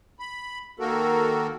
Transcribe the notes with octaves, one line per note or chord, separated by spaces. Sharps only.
B5
D#3 A#3 F#4 A4 A#4